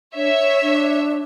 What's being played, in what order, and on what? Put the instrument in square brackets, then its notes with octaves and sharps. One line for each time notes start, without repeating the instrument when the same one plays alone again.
[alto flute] D4 [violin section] C#5 E5
[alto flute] D4